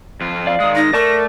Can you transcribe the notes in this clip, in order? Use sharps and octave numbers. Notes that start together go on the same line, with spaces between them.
F2 F4
D5 F5
D#3 G#3 D#6
D#4 A#6
A3 A#4 D5 A5 C#6